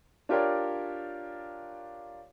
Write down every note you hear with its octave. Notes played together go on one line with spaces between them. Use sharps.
D4 F4 G4 A#4 C#5 D5